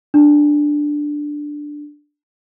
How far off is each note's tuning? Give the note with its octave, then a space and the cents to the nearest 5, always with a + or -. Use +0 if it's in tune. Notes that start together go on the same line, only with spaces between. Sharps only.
D4 +5